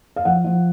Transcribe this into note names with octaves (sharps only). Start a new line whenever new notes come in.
F5
F3 F#5
F3